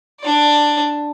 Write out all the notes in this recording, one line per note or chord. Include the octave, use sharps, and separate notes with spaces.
D4 D5